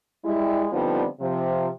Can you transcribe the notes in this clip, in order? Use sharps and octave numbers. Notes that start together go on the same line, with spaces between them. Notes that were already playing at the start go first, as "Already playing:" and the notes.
G3 G#3 E4
D3 F3 G3 B3 C4 D#4
C3 F3